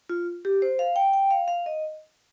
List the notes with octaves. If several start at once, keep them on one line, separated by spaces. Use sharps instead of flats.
F4
G4
C5
F5
G5
G5
F5
F5
D#5